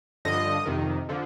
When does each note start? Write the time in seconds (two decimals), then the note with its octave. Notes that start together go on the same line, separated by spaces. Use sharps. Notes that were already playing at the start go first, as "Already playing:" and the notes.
0.25 G2 D3 F3 D#5
0.66 F2 C3 D#3
1.09 D3 F3